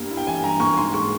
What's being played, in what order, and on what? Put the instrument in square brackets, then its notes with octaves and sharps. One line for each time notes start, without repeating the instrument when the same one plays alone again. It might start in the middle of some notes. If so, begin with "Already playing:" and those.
Already playing: [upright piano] G2 G3 A#3
E4
G5
E3 G#5
G2 A#5
A#3 C#6
G#2 C6
G#3 C#6